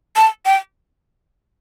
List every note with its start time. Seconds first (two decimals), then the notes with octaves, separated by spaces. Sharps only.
0.16 A5
0.46 G5